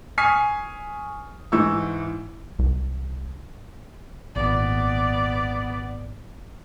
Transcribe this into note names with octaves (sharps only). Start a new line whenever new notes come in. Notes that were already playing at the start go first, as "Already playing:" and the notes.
G#5 C#6 D#6 F6 B6 C7
G#2 E3 C#6 E6
C2
G#1 A#2 B3 D5